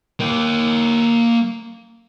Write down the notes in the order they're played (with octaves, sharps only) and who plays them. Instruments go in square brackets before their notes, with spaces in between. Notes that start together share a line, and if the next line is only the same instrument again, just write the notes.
[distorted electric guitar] A#3 G5